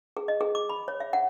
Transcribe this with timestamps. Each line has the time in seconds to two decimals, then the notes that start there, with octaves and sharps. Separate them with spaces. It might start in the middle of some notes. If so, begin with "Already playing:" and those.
0.17 G#4
0.28 D#5
0.41 G#4
0.55 D6
0.69 B5
0.88 C#5
1.00 E5
1.13 F#5